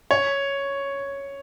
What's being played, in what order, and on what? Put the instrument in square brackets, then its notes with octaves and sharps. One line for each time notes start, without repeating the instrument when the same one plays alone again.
[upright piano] C#5